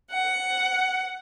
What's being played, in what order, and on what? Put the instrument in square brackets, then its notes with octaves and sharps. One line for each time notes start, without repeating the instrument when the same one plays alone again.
[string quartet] F#5